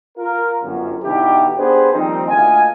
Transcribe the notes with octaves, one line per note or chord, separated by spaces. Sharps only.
F4 A#4
G1 F#2
B2 D3 E3 D#4 E4 G4
B3 D4 G4 G#4 B4 C5
D#3 F3 G3 A#3 C4 D#4
D2 A#2 D#5 F5 G#5